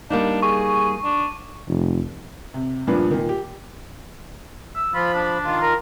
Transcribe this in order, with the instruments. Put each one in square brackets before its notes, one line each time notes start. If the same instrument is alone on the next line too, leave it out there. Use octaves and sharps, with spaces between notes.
[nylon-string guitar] G3 A#3 D#4 [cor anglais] D4
[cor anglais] G#4 [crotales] C#6
[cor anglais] D4
[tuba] F1
[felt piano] C3
G2 A#2 F3 B3 D4
A#2 D#3
G4
[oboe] E6
[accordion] F3 B5 [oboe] F4
[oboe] D4
[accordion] D#3 F4
[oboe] A#4